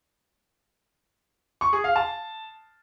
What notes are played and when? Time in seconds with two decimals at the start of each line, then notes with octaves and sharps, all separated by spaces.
1.61 C#6
1.73 G#4
1.84 F5
1.96 A5